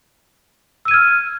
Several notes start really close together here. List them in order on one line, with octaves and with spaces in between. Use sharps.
E6 D#7 G#6 F6